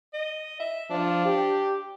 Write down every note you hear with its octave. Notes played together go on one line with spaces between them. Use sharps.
D#5
E5
F3 D4
G4